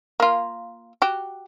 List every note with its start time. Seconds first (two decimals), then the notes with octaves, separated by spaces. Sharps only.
0.20 A#3 F4
1.02 F#4 G4